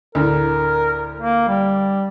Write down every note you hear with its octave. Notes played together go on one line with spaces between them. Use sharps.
D2 A2 A#4
A#3
G3